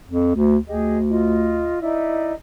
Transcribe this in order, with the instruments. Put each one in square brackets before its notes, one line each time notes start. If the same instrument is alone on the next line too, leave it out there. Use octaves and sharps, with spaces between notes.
[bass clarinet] F2
D2
[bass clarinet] D2 [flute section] G4 G#4 D#5
[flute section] F4 D#5
D#4 E4 D5